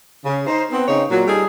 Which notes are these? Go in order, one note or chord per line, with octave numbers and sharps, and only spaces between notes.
C#3
D#4 C5
B3 C4
C#3 C4 D#4 C#5
A#2 F#3
G3 D#4 G#4 A4